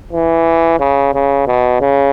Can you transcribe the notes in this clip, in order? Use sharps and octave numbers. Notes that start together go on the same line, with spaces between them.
E3
C#3
C#3
B2
C#3